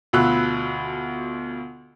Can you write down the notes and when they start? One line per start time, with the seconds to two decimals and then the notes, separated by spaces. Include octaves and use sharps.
0.13 D2 B2 F4 B5 E6 F#6